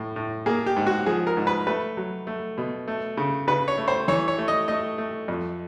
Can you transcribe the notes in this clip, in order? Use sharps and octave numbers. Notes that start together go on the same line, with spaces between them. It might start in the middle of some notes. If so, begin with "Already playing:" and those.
Already playing: A2
A2
A#3 G#4
G4
G#2
F#4
F3 G#4
A#4
G#2
B4
A3 B4
F#3
A3
B2
A3
C#3
C#3 B4
C#5
A3
C5
E3 C#5
C#5
A3
D#5
A3 D#5
A3
F2